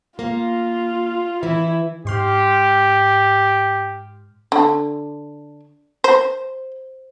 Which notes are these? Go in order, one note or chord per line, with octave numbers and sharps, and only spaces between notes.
A#3 F4
E3 E4
G#2 G4 C6 F6
D3
C5